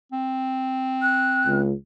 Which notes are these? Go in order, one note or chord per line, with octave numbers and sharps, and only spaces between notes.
C4
F#6
C#2